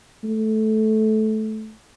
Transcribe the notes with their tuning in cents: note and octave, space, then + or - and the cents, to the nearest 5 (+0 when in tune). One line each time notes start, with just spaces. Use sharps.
A3 -15